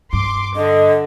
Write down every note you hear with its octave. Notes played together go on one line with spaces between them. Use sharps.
G2 C6 D6
D3 D#5